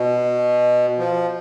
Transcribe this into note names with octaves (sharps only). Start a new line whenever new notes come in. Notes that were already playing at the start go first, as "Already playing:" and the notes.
Already playing: B2
F3